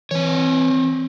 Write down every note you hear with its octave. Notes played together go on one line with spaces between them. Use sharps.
E3 C4 C#5